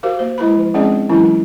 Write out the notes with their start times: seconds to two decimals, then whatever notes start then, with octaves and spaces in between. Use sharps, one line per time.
0.03 F#4 G4 A#4 C5 F5
0.19 A#3 C5
0.38 G#3 E4 B4 B5
0.57 F3
0.74 G#3 C4 C#4 D#4 G#4 D5
1.09 E3 F#3 G#3 C#4 E4